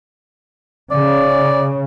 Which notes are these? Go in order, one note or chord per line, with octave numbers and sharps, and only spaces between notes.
C#3 D5